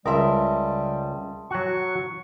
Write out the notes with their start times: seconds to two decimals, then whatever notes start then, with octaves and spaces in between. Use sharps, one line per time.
0.06 C#2 G3 A#4 E5 A5 C6 D#6
1.51 F#3 F#4 C#6